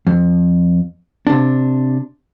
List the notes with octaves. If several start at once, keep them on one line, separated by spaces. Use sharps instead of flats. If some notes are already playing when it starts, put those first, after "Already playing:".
F2
C3 D4